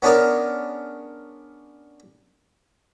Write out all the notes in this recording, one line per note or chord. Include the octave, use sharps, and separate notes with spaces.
B3 C#4 D4 G#4 A#4